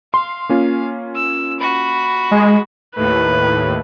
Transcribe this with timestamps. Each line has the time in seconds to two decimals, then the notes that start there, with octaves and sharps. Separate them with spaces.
0.14 F5 C6
0.49 A#3 C#4 F4
1.15 E6
1.60 F#4 B5
2.31 G#3
2.96 D#2 A2 B4